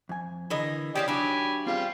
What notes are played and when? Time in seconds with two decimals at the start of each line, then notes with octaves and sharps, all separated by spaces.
0.09 F2 G#5
0.50 D3 E3 A#3 D#5
0.95 C#4 G4 C5 D5 F5 G5 D#6
1.08 F#3 D4 G4 G#5 B5
1.67 G3 C4 F4 G#4 F5